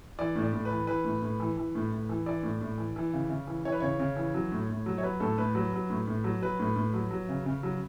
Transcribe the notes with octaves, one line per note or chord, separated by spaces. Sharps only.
E3 D5
A2
D5
A2
B4
E3
E3 B4
A2
A2
E3
E3
A2
A2
E3
E3 D5
A2
A2
E3
E3
C#3
C#3
E3
E3 C#5
B4
C#3 C#5
C#3
E3
F#3
A2
A2
F#3
C#5
F#3 B4
A2 A4
A2 B4
F#3 B4
F#3
A2
A2
F#3
F#3 B4
A2
A2
F#3
F#3
C#3
C#3
F#3